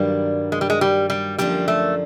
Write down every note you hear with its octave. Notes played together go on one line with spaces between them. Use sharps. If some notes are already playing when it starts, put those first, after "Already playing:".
Already playing: G2 D#3 F#3 G3 A#3 D4
G#3
G3
G#3
G3
G3
F#2 D3 F3 G3 A#3 D4
A3